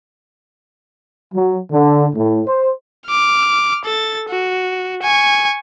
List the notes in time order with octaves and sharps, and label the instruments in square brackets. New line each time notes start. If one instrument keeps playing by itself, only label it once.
[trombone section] F#3
D3
A2
C5
[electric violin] D6 F6
A4 A6
F#4
G#5 C#6